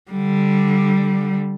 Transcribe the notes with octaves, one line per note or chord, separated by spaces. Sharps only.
D3 G3